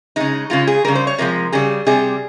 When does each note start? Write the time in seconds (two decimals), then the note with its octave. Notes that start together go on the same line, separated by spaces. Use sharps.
0.16 C#3 G#3 D#4
0.50 C#3 G#3 F4
0.67 G#4
0.85 C#3 G3 A#4
0.95 C5
1.07 C#5
1.18 C3 F3 G#3 A#4
1.52 C#3 G3 G#4
1.86 C3 G3 G#4